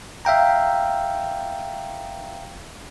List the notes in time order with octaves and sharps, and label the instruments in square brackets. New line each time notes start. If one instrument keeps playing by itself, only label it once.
[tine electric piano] E5 F5 G5 A#5